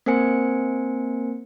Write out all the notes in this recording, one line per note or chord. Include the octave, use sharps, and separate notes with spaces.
A#3 C4 A#4 C5 G#5 C#7